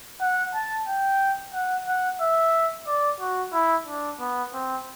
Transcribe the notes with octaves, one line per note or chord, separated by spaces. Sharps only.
F#5
A5
G5
F#5
F#5
E5
D5
F#4
E4
D4
B3
C4